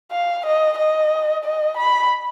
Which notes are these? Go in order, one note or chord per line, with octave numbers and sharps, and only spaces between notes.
F5
D#5
D#5
D#5
B5